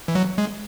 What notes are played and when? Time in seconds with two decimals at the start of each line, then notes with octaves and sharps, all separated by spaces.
0.08 E3
0.15 F#3
0.38 G#3